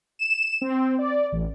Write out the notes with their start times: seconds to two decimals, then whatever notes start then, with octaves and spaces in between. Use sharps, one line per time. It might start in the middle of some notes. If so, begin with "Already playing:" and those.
0.19 E7
0.61 C4
0.99 D5
1.32 A1